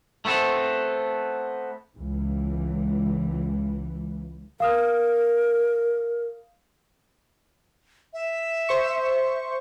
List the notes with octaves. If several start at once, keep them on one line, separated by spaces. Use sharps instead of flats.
A3 B3 C4 A4
C#2 E3
A#4 F5 D#6 F6
E5
C5 C#6